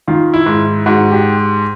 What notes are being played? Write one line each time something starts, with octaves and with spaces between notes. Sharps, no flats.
D#3 F4
E4
G#2
G#2 F#4
G4